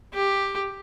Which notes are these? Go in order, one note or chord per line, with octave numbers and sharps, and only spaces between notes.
G4